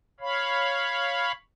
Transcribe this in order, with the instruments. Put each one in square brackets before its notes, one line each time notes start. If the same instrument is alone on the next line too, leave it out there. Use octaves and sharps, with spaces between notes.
[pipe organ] C#5 F5 B5